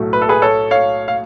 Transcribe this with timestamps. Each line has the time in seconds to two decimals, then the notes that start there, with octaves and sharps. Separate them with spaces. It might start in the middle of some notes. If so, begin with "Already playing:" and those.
Already playing: B1 A2 F#3 A3
0.13 B4
0.22 A4
0.29 G#4 B4
0.42 A4 C#5
0.71 C#5 F5
1.08 F5